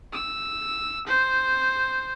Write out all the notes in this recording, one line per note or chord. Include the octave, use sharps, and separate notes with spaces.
E6
C5